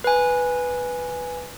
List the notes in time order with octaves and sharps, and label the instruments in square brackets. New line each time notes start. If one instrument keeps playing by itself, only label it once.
[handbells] B4 G#5